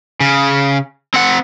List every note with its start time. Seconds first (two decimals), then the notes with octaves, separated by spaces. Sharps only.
0.20 C#3
1.14 C4 F#5